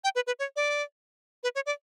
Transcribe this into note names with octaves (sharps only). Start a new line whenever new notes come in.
G5
B4
B4
C#5
D5
B4
C#5
D5